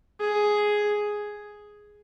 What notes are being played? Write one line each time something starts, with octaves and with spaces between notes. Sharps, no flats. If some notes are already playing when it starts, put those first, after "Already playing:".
G#4